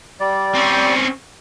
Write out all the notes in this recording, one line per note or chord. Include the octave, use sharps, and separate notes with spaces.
G3 D5
C4 C#4